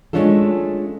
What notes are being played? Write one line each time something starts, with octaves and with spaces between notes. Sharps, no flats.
G#3 A3 C#4 D4 F4 A4